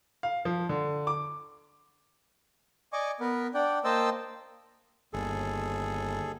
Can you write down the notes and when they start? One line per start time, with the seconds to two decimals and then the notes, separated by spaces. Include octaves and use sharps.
0.23 F5
0.45 F3
0.69 D3
1.07 D6
2.93 D5 D#5 G#5 C#6 D6
3.20 B3 A#4 B4
3.54 D4 D5 F#5 G5
3.84 A#3 C5 D#5 G5 A5 E6
5.13 G1 D#2 G#4 A4